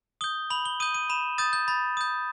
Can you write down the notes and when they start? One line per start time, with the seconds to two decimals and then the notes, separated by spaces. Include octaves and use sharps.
0.21 D#6 G6 G7
0.50 B5 F#7
0.65 G7
0.80 D#6 G6 D#7
0.94 D#7
1.10 B5 E7
1.38 D#6 G6 A6
1.53 G6
1.68 B5 A6
1.97 D#6 G6